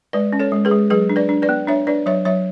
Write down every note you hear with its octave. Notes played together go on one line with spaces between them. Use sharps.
G#3 B4 D5
C#4
A4 C#5
G#3
G#4 B4
G#3
F#3 G#4 B4
D4
B4 D5
D4
B4 D5
B3
D4 C#5 E5
D4 B4 D5
F#3 C#5 E5
F#3 C#5 E5